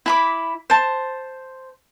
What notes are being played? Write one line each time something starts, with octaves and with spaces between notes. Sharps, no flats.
E4 B5 D6
C5 A5